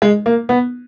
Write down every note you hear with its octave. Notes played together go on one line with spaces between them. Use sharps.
G#3
A#3
B3